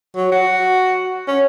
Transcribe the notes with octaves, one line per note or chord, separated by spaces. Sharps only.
F#3
F#4
C#4